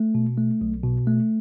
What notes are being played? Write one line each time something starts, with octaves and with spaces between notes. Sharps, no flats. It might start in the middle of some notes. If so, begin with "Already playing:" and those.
Already playing: A3
B2
A3
B1
B2
A3